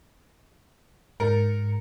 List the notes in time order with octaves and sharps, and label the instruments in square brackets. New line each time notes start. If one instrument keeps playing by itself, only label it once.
[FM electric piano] G#2 C#7 [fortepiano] A#4